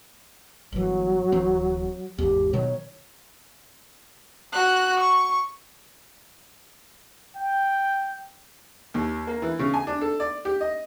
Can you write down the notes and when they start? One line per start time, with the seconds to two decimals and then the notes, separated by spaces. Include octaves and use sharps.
0.72 G1 E3 F#3
1.32 D1 E3 C4
2.18 G#1 E2 G4
2.53 B2 D#3 F#3 C#5
4.52 F#4 F#6
5.00 C#6
7.37 G5
8.94 D#2
9.27 A#3
9.42 E3
9.59 C#3
9.74 G#5
9.87 D4
10.01 A4
10.20 D5
10.45 G4
10.61 D#5